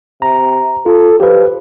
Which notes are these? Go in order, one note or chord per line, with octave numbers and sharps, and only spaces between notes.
C3 A#5
F4 A4
F3 G4 B4